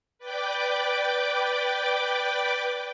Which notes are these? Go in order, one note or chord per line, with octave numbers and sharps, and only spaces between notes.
B4 D5 G5 D6